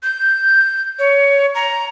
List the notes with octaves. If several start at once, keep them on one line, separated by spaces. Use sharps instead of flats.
G6
C#5
A#5